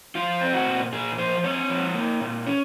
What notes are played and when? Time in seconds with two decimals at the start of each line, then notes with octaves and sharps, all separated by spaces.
0.15 F3 F4
0.41 C4
0.53 F#4
0.67 A#2
0.92 A#2 G#4
1.18 F3 C5
1.44 C4 C#5
1.70 F3
1.95 A#3
2.21 A#2
2.46 C#4